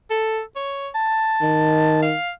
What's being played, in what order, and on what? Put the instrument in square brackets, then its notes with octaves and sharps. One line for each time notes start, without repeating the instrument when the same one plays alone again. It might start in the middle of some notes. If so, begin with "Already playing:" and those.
[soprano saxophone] A4
C#5
A5
[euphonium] D#3
[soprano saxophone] F5